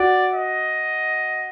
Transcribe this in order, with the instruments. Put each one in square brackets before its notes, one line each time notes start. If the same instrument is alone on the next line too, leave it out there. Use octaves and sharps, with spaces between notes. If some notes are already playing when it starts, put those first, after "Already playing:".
Already playing: [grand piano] F#4 [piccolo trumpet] D5
[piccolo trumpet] D#5